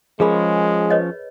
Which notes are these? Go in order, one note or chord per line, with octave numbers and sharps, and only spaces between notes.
F3 G#3 C#4 G#4 A#4 B5
B4 C#5 D#5